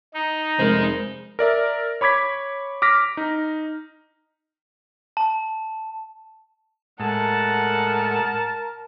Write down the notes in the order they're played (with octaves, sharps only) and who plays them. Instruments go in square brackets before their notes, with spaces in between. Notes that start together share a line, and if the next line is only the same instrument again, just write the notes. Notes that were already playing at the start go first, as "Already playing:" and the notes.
[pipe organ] D#4
[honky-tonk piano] F1 A3 [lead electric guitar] G#3 [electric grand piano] A#4 C5
[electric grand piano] A#4 D5 E5
C#5 B5 D6 G#6 B6
D6 F6 A#6 B6
D#4
[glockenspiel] A5
[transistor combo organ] A2 G#3 [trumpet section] A#4 A5 [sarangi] F#5